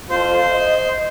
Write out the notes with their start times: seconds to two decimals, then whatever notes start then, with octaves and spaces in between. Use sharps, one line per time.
0.10 F2 F4 A4 C5
0.52 D#5